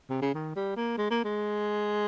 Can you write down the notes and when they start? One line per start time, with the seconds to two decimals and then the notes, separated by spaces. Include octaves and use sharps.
0.10 C3
0.22 C#3
0.34 D#3
0.56 G3
0.76 A#3
0.98 G#3
1.11 A#3
1.24 G#3